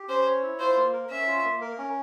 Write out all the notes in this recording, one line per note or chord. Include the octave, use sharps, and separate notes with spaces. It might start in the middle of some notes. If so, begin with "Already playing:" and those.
Already playing: G4
C#4 C5
C#5
E4
F4 C5
A#3
A#4
C#4 E5
F4
A#3
A#4
C#4